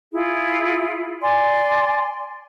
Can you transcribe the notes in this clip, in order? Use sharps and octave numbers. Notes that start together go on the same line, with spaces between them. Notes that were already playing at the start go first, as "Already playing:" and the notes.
E4 F4 G#4
D5 G#5 C6